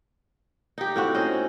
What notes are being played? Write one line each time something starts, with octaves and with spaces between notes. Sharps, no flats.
D#4 G4
A2 C4 F#4
C#4 C5 D#5